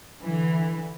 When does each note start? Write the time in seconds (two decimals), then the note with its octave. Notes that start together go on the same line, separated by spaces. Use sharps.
0.23 D3 E3